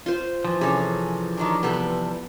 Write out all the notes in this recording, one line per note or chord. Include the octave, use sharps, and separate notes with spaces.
F4 C5
E3 F3
C3 C#4 G#4 A4
D#3 F#3 D4
C3 G3 B3 A4